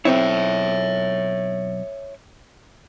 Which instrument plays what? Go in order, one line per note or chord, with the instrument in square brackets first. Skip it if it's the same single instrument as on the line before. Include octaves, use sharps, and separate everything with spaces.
[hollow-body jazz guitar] B1 C4 E4 [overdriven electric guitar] C#5 E5